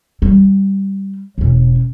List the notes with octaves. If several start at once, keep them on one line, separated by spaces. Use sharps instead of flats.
G3
E1 C#4